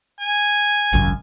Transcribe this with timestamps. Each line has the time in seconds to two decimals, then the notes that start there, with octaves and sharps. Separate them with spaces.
0.21 G#5
0.93 G#1 C#2 F#2